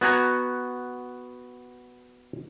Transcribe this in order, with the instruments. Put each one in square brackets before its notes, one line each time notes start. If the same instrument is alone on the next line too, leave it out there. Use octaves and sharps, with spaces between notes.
[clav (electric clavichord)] B3 F#4 G#5 A#5